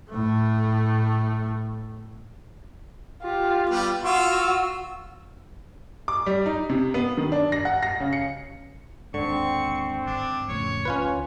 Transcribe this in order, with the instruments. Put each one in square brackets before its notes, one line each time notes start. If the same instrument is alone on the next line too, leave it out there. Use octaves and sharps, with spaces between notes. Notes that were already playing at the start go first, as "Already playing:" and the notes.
[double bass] A2 A3
[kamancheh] F4 G4
[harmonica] G3 B3
[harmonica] F4 F5 C#6 [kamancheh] F#4 E6
[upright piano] D6
G3
D#4
C3
B3
D#3
D4
A#6
F#5
A#6
C#3
C#7
[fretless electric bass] D#2 G#2 [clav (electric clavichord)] D3 [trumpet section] C4 [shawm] C#6
[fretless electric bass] G#1 [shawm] D4
[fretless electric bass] F2 A2 C#3 [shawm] C#5
[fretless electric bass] D2 [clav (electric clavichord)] C#4 F4 B4